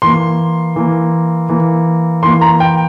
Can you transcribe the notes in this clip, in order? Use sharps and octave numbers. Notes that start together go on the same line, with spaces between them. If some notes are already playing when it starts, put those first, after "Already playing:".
E3 A#3 C6
E3 A#3
E3 A#3
E3 A#3 C6
A#5
G5